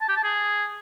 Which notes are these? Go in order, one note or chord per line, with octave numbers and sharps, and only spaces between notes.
A5
G4
A5
G#4